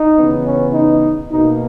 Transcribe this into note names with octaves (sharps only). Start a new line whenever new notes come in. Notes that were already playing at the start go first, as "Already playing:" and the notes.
Already playing: D#4
C#3 E3 B3
C#4
D#4
B2 A#3 D#4